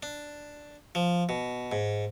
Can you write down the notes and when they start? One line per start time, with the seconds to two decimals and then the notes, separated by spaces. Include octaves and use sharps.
0.03 D4
0.95 F3
1.29 B2
1.72 G#2